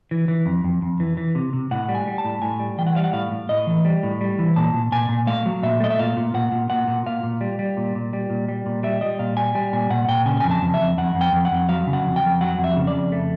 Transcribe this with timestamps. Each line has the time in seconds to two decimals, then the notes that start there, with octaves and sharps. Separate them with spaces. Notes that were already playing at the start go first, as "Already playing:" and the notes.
0.11 E3
0.28 E3
0.46 F2
0.64 F2
0.82 F2
1.00 E3
1.17 E3
1.35 C3
1.53 C3
1.71 A2 F#5
1.89 G3
1.95 G#5
2.07 G3
2.18 A5
2.25 A2
2.42 A2 G#5
2.60 G3
2.78 E3 G5
2.87 F#5
2.96 G3 F5
3.04 F#5
3.13 A2 F5
3.32 A2
3.49 A2 D#5
3.67 E3
3.85 G3
4.03 A2
4.21 G3
4.39 E3
4.56 A#2 A5
4.74 A#2
4.92 A#2 G#5
5.09 A#2
5.27 A3 F5
5.46 F#3
5.63 A#2 E5
5.80 A3 D#5
5.90 E5
5.99 A#2 F5
6.17 A#2
6.34 A#2 F#5
6.52 A#2
6.70 A#2 F#5
6.88 A#2
7.06 A#2 F5
7.23 A#2
7.41 G3
7.59 G3
7.77 A#2
7.95 A#2
8.13 G3
8.30 A#2
8.49 G3
8.66 A#2
8.83 G3 E5
9.01 G3 D#5
9.19 A#2 F5
9.37 G3 G#5
9.55 G3 G#5
9.73 A#2 G#5
9.90 A#2 F#5
10.08 A#2 G5
10.26 C#3 G#5
10.40 F2 G#5
10.51 A5
10.62 F2
10.74 E5
10.80 F2
10.98 F2 F#5
11.15 F2
11.21 G5
11.33 F2
11.45 F#5
11.51 F2
11.69 F#3 F5
11.87 C#3
11.93 F#5
12.05 F2
12.16 G5
12.23 F2
12.41 F#3 F#5
12.59 F2
12.64 E5
12.77 C#3
12.87 D5
12.94 F2
13.12 A3